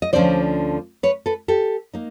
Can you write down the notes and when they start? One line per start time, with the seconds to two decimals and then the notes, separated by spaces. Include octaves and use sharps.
0.02 D#5
0.13 D2 D3 F3 A3 C#4 C5 D5
1.03 B4 C#5
1.26 A4 B4
1.48 G4 A4
1.94 A#3 D#4